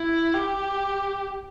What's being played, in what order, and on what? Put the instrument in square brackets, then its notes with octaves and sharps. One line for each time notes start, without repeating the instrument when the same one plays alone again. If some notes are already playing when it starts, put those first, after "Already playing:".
Already playing: [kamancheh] E4
G4